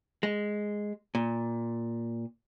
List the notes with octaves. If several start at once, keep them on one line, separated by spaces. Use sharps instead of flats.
G#3
A#2